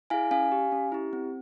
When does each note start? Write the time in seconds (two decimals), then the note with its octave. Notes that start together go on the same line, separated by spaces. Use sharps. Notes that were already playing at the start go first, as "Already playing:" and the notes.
0.10 E4 G#4 F5 G#5
0.31 C#4 F5 G#5
0.52 G4
0.72 C#4
0.92 E4 G4
1.13 C4